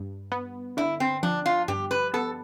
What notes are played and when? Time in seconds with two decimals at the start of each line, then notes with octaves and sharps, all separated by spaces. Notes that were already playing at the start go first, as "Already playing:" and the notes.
Already playing: G2
0.32 B3
0.77 D3 E4
1.00 C4
1.23 F3 D4
1.46 F4
1.68 G2 G4
1.91 B4
2.14 B3 A4